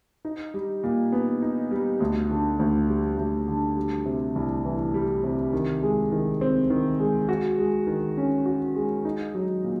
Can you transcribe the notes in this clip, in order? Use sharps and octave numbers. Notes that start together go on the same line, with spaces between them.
D#4
G3
A#2
B3
D#4
G3
D2
D3
D2
G3
D2
D3
G3
C3
C2
E3
G3
C3
D#3
G#3
D#3
C4
D#3
G#3
F#4
G#3
D#3
C#4
F#4
G#3
D#4
F#3
A#2